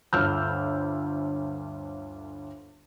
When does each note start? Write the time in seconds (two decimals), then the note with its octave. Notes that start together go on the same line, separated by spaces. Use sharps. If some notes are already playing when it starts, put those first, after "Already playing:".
0.13 G1 D2 E6 F6 G6